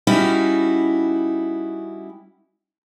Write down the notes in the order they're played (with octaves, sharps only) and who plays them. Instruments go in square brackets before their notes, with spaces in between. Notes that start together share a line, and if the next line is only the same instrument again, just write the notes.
[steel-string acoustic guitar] G3 C#4 D#4 E4 F#4